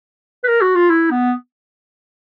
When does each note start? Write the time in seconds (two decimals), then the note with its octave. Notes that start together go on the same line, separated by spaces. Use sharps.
0.44 B4
0.48 A#4
0.61 F#4
0.75 F4
0.90 E4
1.11 B3